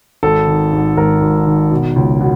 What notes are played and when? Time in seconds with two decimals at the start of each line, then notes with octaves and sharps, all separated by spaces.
0.23 G#1 A4
0.47 D#3
0.72 G#2
0.97 G#1 A#4
1.21 G#1
1.47 D#3
1.71 B2
1.96 C#2
2.21 B2